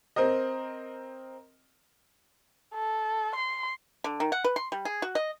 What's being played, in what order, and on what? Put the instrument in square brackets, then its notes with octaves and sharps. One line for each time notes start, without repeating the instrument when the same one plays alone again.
[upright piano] C4 A#4 D#5
[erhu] A4
C6
[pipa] D3
D#3
F#5
B4
C6
G3
G#4
F#4
D#5